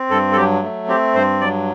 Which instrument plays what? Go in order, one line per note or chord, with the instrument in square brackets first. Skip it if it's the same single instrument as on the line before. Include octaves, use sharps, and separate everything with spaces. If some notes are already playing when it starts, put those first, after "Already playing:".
Already playing: [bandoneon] C4
G2 A4
A4
F#3 G4
A3
C4 G4
G2 C5
F#3 D5